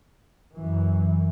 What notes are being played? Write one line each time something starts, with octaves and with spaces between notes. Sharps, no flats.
F#2 E3